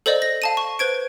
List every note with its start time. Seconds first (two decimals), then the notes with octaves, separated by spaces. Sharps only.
0.06 A4 C5 D5 D#5
0.22 A#6
0.42 F5 A5 D#7
0.57 C#6
0.79 B4 C5 G#6 D7